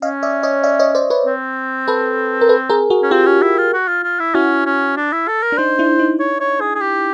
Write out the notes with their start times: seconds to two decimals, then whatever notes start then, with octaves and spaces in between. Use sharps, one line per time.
0.02 C#4 D#5 F5
0.23 D5 E5
0.43 C#5 D#5
0.63 D5 E5
0.79 C#5 D#5
0.95 C5 D5
1.10 B4 C#5
1.26 C4
1.88 A4 B4
2.41 A#4
2.49 A4 B4
2.69 G#4 A#4
2.90 F#4 G#4
3.03 C#4
3.11 C4 F4 G4
3.26 C#4
3.43 E4
3.58 F4
3.73 F#4
3.88 F4
4.04 F4
4.20 E4
4.34 C#4 E4 F#4
4.66 C#4
4.97 D4
5.12 E4
5.28 A4
5.43 A#4
5.52 D4
5.58 D#4 C5
5.79 D4 E4
5.99 D#4
6.20 C#5
6.40 C#5
6.61 G#4
6.75 G#4
6.81 G4